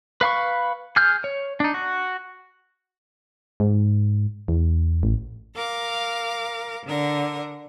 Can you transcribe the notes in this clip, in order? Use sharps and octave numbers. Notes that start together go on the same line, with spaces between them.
B4 F5 B5 C#6
G#4 F6 G6
C#5
D4 D#4
F#4
G#2
E2
A1
A#4 F5 D6
D3 A#4